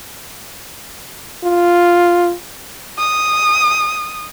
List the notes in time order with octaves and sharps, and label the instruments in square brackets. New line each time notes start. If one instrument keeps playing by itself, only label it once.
[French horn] F4
[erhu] D#6